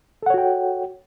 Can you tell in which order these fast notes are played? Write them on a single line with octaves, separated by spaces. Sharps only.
A4 F#5 C#5 F#4 G5